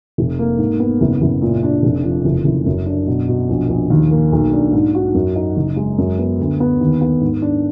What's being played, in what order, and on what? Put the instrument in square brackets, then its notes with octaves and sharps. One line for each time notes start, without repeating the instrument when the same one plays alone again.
[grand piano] F1
A#3
G#2
B3
F#1
F#1
A#2
D4
F1
F3
F#1
F#1
F#2
D4
B2
B2
A#1
A#1
D#2
A#3
B1
D4
G#2
F#4
F#2
D#4
F#1
G#3
F#2
B3
D2
B3
D#2
B3
G#2
D4